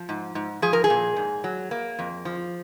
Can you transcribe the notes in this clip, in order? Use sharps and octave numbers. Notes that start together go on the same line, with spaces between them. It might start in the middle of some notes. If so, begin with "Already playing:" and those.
Already playing: F3
G#2
G#2
F3 G#4
A#4
G#4
A#2
G#2
F#3
A#3
F2
F3